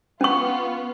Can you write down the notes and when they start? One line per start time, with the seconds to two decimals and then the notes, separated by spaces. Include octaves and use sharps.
0.21 B3 C#4 F4 C#6